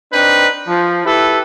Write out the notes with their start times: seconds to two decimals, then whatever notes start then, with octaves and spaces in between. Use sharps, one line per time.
0.11 C4 D4 D#4 B4
0.67 F3
1.04 E4 G4 A4 B4